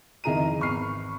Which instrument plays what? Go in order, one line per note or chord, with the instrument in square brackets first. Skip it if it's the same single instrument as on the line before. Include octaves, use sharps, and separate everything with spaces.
[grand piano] F2 D#3 E4 G#4 A#5 D#7
G#1 E2 B5 C#6 F6 C7